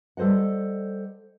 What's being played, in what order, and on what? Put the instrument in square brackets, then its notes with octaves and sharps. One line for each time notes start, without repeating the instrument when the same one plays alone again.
[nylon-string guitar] G3 A4 C5 D#5 F#5